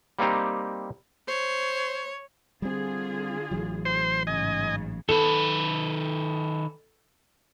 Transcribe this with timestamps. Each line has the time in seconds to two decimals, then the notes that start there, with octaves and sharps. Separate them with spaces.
0.19 G3 A#3 C4 D#4 G4
1.28 C5 C#5
2.62 D3 G3 C4 F4 G#4
3.51 A1 E3 F#3
3.85 C5 C6
4.27 G#2 C#3 G#3 D#5 G#5
5.09 D#3 A4 B4